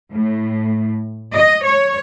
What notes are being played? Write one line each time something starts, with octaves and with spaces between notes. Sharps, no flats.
A2
D#5
C#5